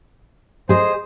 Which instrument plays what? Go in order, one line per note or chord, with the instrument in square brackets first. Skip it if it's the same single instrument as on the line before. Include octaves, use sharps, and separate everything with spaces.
[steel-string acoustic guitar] G#4 D#5 [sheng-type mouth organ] C5